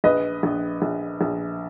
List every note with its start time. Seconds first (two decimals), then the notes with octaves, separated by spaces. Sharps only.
0.04 A#1 B4 D#5
0.43 A#1
0.82 A#1
1.21 A#1